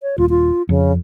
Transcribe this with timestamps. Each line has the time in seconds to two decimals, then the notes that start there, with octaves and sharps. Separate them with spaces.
0.02 C#5
0.18 D#1 F4
0.30 F4
0.69 F2 C#3